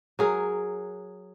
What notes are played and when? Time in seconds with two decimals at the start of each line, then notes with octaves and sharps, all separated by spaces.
0.19 F#3 G#4 A#4